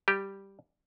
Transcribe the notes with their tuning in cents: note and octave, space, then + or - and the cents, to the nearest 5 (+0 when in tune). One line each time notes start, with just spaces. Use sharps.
G3 +0 G4 +0